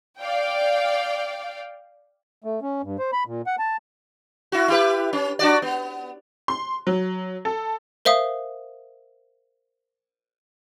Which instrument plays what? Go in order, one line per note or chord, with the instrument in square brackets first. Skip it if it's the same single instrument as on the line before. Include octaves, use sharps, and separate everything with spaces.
[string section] D5 F5 G5
[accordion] A3
C#4
G2
C5
B5
A#2
F#5
A5
[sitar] E4 F#4
E4 G4 B4
C#4
D4 F#4 D5
B3
[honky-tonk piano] C6
F#3
A4
[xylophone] A#4 C5 E5 F5 D#6